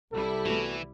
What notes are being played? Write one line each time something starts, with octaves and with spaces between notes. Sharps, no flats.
C2 G3 E4 A4
E3 A3 B3 F#4